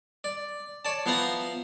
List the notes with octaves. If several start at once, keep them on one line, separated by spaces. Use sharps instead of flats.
D5
C#5 D5 A5
F3 B3 E4 C5 A#5 D#6